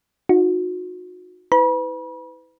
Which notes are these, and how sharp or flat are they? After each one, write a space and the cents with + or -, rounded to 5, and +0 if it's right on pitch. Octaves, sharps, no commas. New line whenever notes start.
D#4 +0 F#4 -35
E4 -30 B4 +30 B5 -40